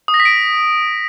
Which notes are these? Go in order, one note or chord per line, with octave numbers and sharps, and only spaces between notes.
D#6
A#6
B6
D7